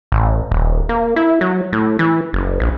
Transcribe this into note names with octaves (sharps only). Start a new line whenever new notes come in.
A1
D#1
A#3
E4
F#3
A2
E3
F#1
A#1